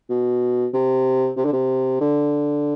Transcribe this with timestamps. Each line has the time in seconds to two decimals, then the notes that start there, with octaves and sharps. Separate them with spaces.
0.10 B2
0.74 C3
1.37 C3
1.45 D3
1.53 C3
2.01 D3